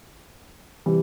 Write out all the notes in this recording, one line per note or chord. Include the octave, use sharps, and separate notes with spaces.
C3 E3 G3